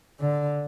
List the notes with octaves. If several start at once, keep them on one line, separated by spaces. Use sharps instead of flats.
D3